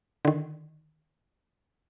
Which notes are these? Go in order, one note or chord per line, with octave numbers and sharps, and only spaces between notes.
D3 D#3